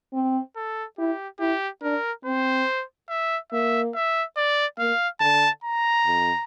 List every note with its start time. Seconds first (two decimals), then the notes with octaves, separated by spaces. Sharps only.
0.13 C4
0.56 A4
0.98 E4 G4
1.40 E4 G4
1.82 D4 A#4
2.25 C4 C5
3.09 E5
3.52 A#3 E5
3.95 E5
4.37 D5
4.79 A#3 F5
5.21 D3 A5
5.64 A#5
6.06 F2